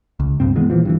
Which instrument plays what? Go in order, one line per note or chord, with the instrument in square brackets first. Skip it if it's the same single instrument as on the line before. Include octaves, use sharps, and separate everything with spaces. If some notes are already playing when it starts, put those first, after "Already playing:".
[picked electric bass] C#2
G2 B2 C4
D#3 E3 G#3 B3
A#2 E3 F3
G2 C#3 E3